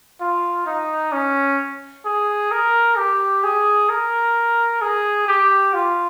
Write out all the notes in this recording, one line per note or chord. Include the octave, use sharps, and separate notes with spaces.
F4
D#4
C#4
G#4
A#4
G4
G#4
A#4
G#4
G4
F4